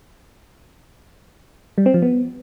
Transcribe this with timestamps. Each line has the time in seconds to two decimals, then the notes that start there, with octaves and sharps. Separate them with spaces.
1.78 G3
1.86 C4
1.94 F3
2.02 B3